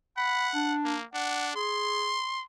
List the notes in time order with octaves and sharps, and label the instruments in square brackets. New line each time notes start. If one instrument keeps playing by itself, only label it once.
[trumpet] F#5 [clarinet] B5
[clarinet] D4
[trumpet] A#3
[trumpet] D4 [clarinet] F#5
[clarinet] G#4 [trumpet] C6